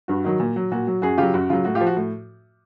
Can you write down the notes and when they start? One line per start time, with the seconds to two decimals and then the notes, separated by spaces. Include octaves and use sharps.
0.08 G2 F#4
0.24 D#3 F#3
0.40 A#2
0.56 F#3
0.72 A#2 F#4
0.87 F#3
1.02 F#2 F#4 G#4
1.18 C#3 F#3 F4 G4
1.34 F#2 F#4
1.49 C#3 F#3 F4
1.65 A2 F#4
1.75 F4 G4
1.81 F3
1.87 F#4
1.97 A2